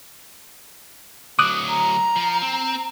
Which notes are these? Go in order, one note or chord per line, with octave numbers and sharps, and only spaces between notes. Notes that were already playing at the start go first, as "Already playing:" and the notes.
D2 F#3 D6 D#6 F#6
A#5
F3
C4